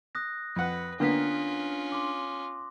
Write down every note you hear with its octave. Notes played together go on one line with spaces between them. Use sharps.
D#6 F#6 A#6
F2 B4 F#5
D3 A#3 B3 C#4 D4 F4 B6
C6 D6